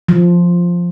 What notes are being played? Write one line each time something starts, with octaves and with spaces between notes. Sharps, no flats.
F3